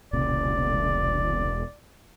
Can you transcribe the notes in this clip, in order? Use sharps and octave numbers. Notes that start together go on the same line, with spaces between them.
E1 C2 A#2 C#3 D5